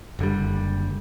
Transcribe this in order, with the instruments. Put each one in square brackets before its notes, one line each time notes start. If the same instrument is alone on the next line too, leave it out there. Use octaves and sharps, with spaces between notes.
[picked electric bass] F#1 D3 G3